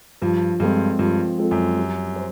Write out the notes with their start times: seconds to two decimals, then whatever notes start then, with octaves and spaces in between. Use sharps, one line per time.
0.22 G2 F3
0.60 G2 G#3 C4 F4 A4
0.99 G2 F3
1.38 G#3 C4 F4 A4
1.51 F#2
1.76 G3
2.16 C5